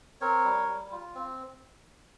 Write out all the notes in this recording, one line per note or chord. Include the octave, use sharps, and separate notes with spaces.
C4 A#4 C#5
G3
G3
F4
C4